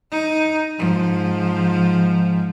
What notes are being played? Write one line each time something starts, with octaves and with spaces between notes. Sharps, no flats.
D#4
G#2 F3